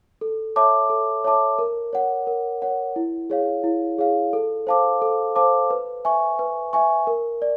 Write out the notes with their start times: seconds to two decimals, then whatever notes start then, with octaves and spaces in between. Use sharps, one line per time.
0.21 A4
0.56 C#5 E5 A5 D6
0.90 A4
1.24 C#5 E5 A5 D6
1.59 A#4
1.93 C#5 F#5
2.27 A#4
2.62 C#5 F#5
2.96 E4
3.30 G#4 C#5 F5
3.64 E4
3.98 G#4 C#5 F5
4.33 A4
4.67 C5 F5 A5 D6
5.02 A4
5.36 C5 F5 A5 D6
5.70 B4
6.05 E5 G#5 C#6
6.39 B4
6.73 E5 G#5 C#6
7.07 A#4
7.42 D5